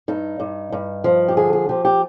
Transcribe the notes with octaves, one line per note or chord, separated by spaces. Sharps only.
G2 D#4
G2
G2
F3
G4
D3 G#4
G#4
F3 G4
G4